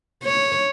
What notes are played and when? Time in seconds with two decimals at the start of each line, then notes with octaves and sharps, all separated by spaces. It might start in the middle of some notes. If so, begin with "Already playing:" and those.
0.24 C#5